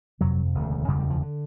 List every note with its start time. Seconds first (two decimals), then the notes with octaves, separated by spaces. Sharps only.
0.21 G1 F2 C3 F#3
0.54 E1 D2 C#3
0.88 E1 D2 C#3 G3
0.99 G3
1.10 F3
1.22 D3